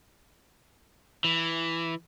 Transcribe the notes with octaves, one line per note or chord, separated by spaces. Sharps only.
E3